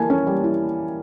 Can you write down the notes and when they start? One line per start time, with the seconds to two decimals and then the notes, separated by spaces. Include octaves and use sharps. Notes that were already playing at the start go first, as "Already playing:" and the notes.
Already playing: E3 G3 A#3 G#5 A5
0.10 C#4
0.27 G3
0.44 E3